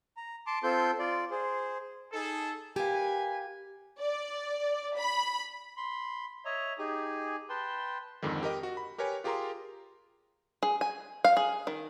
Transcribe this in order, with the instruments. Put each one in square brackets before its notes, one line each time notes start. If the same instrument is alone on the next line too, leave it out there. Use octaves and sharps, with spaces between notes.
[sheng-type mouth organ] A#5
A5 C6 D6
C4 F4 A4 C6 G6
F4 D5
G#4 C5
[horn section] D#4 G#4 A4
[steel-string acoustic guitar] G4 F5 [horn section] A#4 B4 G#5
[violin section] D5
B5
[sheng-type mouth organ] B5 C6
C#5 D#5 E5 A#5
D#4 G4 G#4 G#5
B4 G5 A5 C6
[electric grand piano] F2 G#2 D3 D#3
G4 A#4 D#5 D6
F#4
B5
G4 A#4 B4 C#5 G#5
F4 G4 G#4 A#4 A#5 C6
[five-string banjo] G#4
G#5
F5
G#4
D#3